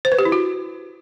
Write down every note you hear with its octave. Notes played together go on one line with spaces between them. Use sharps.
C5
B4
G4
E4
F#4